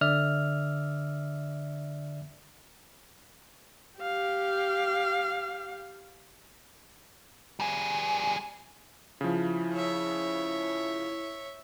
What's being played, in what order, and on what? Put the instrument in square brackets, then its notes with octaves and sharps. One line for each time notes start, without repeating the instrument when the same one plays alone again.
[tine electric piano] D3 D5 E5 F6
[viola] G4 F5
[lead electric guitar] G3 G#4
[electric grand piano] C#3 F3 [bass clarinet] E4
[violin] C#5 E5